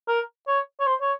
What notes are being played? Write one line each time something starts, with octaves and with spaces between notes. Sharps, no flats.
A#4
C#5
C#5
C5
C#5